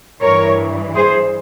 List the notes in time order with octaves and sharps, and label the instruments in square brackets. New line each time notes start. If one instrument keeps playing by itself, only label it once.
[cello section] G2 E3 A#4 C#5
G#4 C5